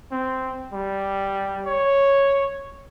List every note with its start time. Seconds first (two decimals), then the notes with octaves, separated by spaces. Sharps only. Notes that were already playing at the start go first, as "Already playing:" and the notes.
0.12 C4
0.73 G3
1.66 C#5